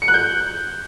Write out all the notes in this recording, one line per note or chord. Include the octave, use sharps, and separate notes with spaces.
C#7
F#6
G6